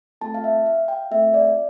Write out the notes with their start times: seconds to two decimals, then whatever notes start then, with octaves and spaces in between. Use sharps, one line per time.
0.21 A3 C4 F4 A4 A5
0.34 F5
0.44 E5
0.66 F5
0.88 G5
1.11 A3 C4 F4 A4 E5
1.34 D5